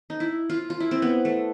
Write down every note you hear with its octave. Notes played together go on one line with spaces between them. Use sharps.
D#4
E4
F4
F4
E4
C4
B3
A3